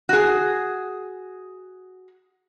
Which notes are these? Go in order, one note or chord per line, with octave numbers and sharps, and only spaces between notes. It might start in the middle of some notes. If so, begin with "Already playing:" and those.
F#4 G#4